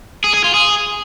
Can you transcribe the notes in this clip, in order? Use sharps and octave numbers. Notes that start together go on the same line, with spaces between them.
G#4
G#4
F4
G#4